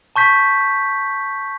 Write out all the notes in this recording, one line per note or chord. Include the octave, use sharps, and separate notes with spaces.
A5 C#6 G6 B6